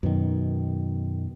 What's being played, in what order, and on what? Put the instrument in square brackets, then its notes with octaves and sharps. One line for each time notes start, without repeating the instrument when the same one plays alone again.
[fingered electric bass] F#2 B2 D#3